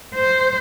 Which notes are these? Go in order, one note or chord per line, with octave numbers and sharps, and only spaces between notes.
C5